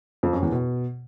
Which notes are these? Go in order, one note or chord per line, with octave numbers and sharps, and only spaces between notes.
F2
F#2
E2
B2